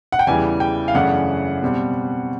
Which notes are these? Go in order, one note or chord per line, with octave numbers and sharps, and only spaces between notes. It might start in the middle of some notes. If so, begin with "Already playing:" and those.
F#5
G5
E2 C#3 E3 G3 G#5
G5
F5
F#2 C#3 E3 A3 D4 F#5
B2 G3 C4